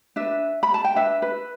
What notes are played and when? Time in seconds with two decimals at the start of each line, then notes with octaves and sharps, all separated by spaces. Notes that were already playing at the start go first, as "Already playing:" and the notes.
0.16 D4 B4 E5
0.63 B5
0.74 A5
0.84 G5
0.95 D4 B4 E5
1.22 B4